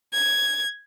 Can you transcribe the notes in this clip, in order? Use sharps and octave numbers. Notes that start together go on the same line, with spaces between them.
G#6